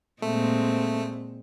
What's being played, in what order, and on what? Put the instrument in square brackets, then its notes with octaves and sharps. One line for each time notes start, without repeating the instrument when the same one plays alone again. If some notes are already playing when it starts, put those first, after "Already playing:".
[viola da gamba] A#2 G#3 C4 [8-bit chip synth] A3